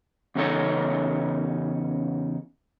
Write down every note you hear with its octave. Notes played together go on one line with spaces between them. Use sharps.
E2 C#3 C#4 D#4 A4 C#5